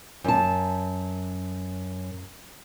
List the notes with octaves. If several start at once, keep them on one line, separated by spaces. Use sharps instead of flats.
F#2 A5